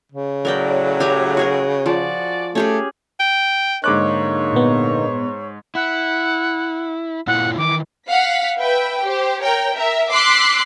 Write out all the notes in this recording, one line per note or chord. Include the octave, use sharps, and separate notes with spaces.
C#3
A2 F#3 A#4 D5 G5
G4 G#5 A#5
F#4 G#4 A#4
F3 C#4 F#4 D5
A3 C#4 G4 G#4
G5
G#2 D3 A#3 D#4 C#5 D6 F#6
A#2 B3
E4 F#5
A#2 E4 F4 F#5
D#3 E3 D6
F5 F#5 B6
B4 E5 G5
G4 C5
A#4 C#5 G5
A#4 E5
C6 D6 E6 F#6 B6 C7